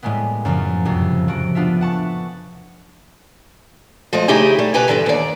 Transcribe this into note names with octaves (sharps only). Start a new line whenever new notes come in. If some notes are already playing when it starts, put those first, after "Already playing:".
A2 G3 G#3 A#3 B3
F#2 C#3 F3
C2 F2 C3
F3 F#4 D7
B3 D4 F4 E5
F#5 A5 C#6
F3 G#3 A3 D#5
C#3 A3 D#4 E4 G4 G#4
G3 A3
B2 G4 B4 G#5 A#5
G2 B2 D3 E3
D#2 D5